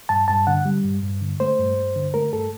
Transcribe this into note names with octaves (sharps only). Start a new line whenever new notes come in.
G2 A5
G2 A5
D3 F#5
G3
G2
G2
D3
A3 C5
G2
G2
D3
A3 A#4
G2 A4